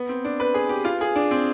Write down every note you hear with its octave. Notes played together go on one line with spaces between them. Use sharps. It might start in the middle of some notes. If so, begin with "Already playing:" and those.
Already playing: B3
C4
D4
B4
G#4
G4
F4
G#4
D4
C4